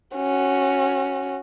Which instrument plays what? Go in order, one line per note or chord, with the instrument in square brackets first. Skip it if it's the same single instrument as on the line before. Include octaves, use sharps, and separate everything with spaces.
[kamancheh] C#4 F#4